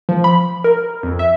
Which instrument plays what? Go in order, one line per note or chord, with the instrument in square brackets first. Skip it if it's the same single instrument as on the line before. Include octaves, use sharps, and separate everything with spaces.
[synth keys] F3
B5
A#4
F2
E5